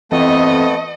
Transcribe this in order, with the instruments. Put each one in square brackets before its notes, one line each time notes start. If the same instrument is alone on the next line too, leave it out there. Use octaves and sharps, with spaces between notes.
[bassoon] F2 [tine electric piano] E3 C4 [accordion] A3 B3 A4 [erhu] D#5